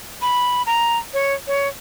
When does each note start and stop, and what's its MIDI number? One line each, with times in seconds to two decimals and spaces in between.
0.22 0.63 83
0.66 0.98 82
1.14 1.34 73
1.47 1.67 73